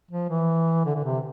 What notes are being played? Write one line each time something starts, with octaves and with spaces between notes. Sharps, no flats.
F3
E3
D3
D3
C3